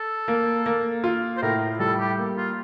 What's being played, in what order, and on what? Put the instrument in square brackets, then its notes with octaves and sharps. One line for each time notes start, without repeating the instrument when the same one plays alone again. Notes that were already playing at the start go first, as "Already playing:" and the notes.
Already playing: [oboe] A4
[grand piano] A#3
A#3
F4
[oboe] C5
[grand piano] A2 [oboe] A#4
[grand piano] G3 [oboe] A4
[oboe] G4
[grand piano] A#3
[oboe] F4